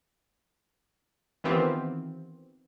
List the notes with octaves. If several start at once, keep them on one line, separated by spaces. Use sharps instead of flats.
D#3 E3 B3 C4 F4 G4